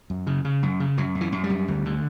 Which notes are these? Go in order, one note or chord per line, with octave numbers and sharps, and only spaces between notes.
F#2
C#3
C#3
F#2
C#3
F#2 F#3
F#2
E3
F#2
G3
F#2
D2
D3